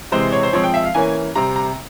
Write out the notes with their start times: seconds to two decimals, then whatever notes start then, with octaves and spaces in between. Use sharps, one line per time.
0.12 C3 E3 G#3 C4 C5
0.32 C#5
0.43 C5
0.53 F3 G#3 C4 C#5
0.64 G5
0.74 E5
0.84 F5
0.95 E3 A#3 C#4 G#5
1.35 C3 G3 C4 A#5
1.56 A#5